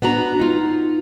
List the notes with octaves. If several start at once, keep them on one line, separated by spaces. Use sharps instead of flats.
B3 D4 F#4 A#5
D#4 F4